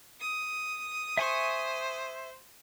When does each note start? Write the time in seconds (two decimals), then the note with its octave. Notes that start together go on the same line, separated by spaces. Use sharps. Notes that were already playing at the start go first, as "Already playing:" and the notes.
0.21 D#6
1.17 C5 E5 G#5 C#6